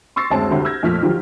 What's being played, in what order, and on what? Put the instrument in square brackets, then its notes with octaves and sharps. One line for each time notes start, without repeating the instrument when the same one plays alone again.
[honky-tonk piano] C6 C#6 E6 A6 A#6 C7
F#1 D2 G#3 C4 C#5 A5
C2 D3 F#4 G4 C5
E6 F6 G6 G#6 A#6
F2 A#2 F3 A3 F6 B6
D3 D#3 F3 F#3 G4